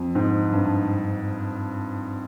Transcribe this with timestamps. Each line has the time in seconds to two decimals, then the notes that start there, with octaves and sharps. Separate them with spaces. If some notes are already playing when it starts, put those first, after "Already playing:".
Already playing: F2
0.15 G#2
0.53 G2